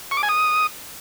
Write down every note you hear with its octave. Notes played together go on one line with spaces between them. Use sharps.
C#6
D6
G#5
D#6